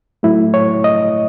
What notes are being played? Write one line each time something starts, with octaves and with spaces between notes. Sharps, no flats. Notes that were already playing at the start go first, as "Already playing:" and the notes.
A2 F#3 A3 E4
C#5
D#5